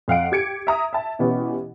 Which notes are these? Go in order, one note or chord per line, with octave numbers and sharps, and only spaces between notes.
F2 F5 F#5 D7
G4 G#6 C#7 D7
E5 A#5 D#6
E5 A5
B2 E3 B3 C#4 G4